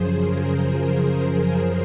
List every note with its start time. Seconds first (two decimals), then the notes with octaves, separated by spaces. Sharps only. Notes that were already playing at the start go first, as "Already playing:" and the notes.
Already playing: F#2 C#3 F3 G#4 C5
0.13 A#4
0.96 C5
1.37 A#4